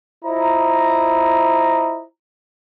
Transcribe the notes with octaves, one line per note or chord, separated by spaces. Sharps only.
E4 F4 C5 D#5 A#5